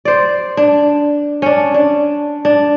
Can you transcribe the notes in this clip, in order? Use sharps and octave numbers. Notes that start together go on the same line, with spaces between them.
C5 D5
D4
C#4 D4
D4
D4